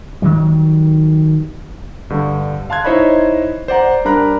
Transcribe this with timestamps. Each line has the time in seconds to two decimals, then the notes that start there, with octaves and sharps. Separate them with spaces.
0.22 D#3 F#3 G3
2.10 G2 D3
2.70 F5 A5 C6 F#6 G#6
2.85 D#4 E4 C5 C#5 D#5 B5
3.68 C5 D5 F#5 A#5
4.05 G3 D4 A#4 A#5 B5 F#6